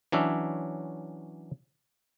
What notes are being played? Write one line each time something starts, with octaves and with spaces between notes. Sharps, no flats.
E3 F#3 C#4 D4 E5